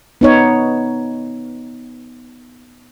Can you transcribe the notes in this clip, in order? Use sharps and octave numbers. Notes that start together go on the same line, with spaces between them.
B3 D#4 C#5